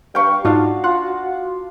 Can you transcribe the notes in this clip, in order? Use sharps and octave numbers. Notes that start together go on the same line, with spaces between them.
G2 B4 F5 G5 C#6
G#2 D4 D#4 F4 F#4 F5
F4 F#5